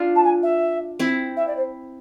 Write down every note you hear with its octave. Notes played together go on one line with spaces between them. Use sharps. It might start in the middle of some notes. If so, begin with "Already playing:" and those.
Already playing: D4 F4
A5
G#5
E5
C4 E4
E5
D5
C5